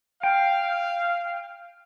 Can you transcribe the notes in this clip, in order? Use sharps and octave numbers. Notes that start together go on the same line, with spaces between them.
F5 G5